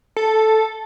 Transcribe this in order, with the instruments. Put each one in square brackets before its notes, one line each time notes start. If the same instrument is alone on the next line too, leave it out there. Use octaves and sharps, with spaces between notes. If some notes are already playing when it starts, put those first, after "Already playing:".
[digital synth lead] A4